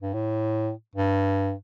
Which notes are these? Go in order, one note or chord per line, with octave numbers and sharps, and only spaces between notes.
G2
A2
G2